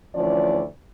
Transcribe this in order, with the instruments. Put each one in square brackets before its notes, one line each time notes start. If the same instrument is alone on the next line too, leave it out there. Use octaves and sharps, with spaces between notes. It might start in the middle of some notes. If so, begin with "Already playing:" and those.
[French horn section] D2 E3 F3 C#4 D5